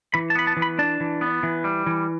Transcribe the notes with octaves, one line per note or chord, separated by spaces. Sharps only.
E3 B5
A5
B3 B5
A5
E3
B5
D4 A5
E3
B3
E3
G3
E3